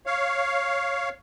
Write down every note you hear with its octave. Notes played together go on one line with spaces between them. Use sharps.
C#5 F5